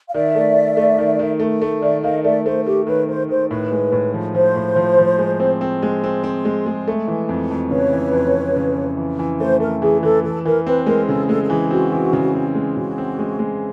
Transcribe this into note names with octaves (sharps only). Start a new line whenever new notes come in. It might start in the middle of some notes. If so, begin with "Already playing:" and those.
F5
D#3 D5 E5
A3
D#3
A3
D#3
D#3
A3
A3
D#3 D5 E5
D#3 D#5 F5
A3 D5 E5
A3 C5
A3 G4
D#3 B4 C#5
D#3 C5
D#3 C5
A2 B4
G#3
A2
F3
F3 C5
A2
F3
F3
G#3
C4
C4
G#3
C4
C4
G#3
G#3
A3
E3
F2
F2
C#3 B4 C#5
E3
F2
F2
C#3
F2
E3
E3
A3 C5
A3 A#4
E3 G#4
E3 A4
E3 A4
E3 A#4
C4 B4
G#3 A#4
C#3 A4
G#3 A4
A4
E3 G#4
C4 F#4
E3
C#3
C4
G#3
C#3 F#4
C4
G#3
G#3